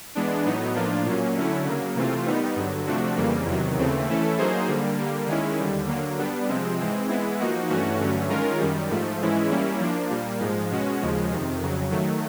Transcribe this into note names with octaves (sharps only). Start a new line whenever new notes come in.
E3 G#3 B3 D4
A2 F#3 B3 D#4
A2 F3 A#3 D4 F4
A#2 F#3 A#3 C#4
D3 F#3 A3 C#4 E4
C#3 F#3 A#3
C3 E3 A3 C4 F4
D#3 G3 B3 D#4
G2 D3 F#3
C3 F3 A3 D4 F#4
F2 C#3 E3 G3 A#3
E2 C3 D#3 F#3
D#2 C#3 E3 A3 C4
E3 A3 C#4 E4 A4
F#3 A#3 D#4 G#4 C5
D3 G3 A#3
D3 G3 A#3
D#3 G#3 C#4 E4
D#2 D3 G3
D3 F#3 A#3
G3 B3 D4
C3 F3 G#3 C4
G#2 E3 G#3 C4
E3 G#3 B3 E4
F3 A#3 D#4 F#4
G2 E3 A3 C#4 F#4
G2 D3 F#3 A3 C#4
D#3 G#3 C#4 F4 A#4
F#2 D#3 G3
G#2 F3 A3
G#2 E3 G#3 C#4 E4
G3 A#3 C#4 E4
F3 A#3 D4
A#2 G3 A#3
G#2 F3 G#3
B2 G#3 C#4 F#4
D#2 C#3 F3 G#3
F2 C3 D#3
F2 C#3 F#3
D#3 F#3 A3